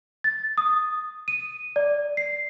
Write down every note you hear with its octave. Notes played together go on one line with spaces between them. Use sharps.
A6
D#6
D#7
D5
C7